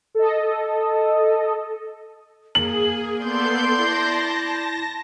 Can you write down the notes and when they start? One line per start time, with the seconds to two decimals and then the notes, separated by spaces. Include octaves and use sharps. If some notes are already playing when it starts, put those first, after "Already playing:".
0.15 A4 D#5
2.55 A#3 G#4 F#7
3.21 B3 A4 D5 C6 G6
3.77 E4 A5 A#6